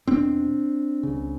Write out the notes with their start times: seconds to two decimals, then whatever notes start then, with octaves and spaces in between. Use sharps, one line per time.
0.07 E2 B2 C4 D4
1.03 C#2 C#3